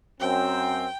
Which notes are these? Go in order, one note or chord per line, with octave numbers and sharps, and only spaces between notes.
F#2 C4 G5